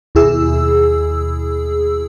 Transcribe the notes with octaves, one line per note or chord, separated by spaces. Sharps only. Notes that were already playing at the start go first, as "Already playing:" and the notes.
D#2 B2 E4 G#4 E6